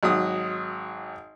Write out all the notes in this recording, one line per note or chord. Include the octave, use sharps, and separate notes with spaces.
G#1 F#3 D#6